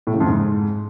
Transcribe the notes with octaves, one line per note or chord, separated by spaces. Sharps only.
A2
C#3
F2
G#2